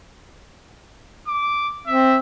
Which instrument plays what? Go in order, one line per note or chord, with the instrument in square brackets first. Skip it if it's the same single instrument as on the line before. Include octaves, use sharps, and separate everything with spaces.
[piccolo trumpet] D6
[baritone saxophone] C4 [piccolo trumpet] E5